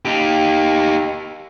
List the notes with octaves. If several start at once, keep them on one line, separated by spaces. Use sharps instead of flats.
D#4 G4